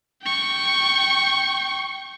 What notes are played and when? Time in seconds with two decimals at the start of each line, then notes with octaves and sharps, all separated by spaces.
0.23 G5 C#6